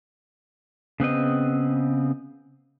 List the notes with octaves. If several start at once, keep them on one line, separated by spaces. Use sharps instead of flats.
C#3 B3 C4 D#5